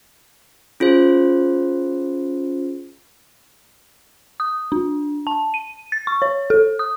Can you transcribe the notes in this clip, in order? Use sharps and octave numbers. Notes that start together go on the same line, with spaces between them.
C#4 F4 G#4 C5
D#6
D4
A5
D#7
A6
C#6
C#5
A4
D#6